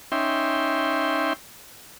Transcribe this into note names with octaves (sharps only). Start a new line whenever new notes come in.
C#4 D#4 E5 G5 C6